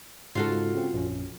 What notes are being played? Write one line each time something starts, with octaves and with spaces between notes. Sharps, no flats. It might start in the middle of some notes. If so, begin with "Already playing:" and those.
G#2 C#3 F4 F#4 A4
C#3 C4
A#1 F#2 C#4